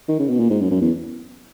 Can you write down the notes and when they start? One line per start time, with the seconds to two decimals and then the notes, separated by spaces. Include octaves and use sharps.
0.09 D#3
0.20 C#3
0.29 B2
0.40 A#2
0.50 G#2
0.61 F#2
0.71 F#2
0.81 E2